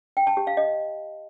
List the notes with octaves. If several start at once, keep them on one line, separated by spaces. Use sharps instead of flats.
G5
A5
G4
F5
D#5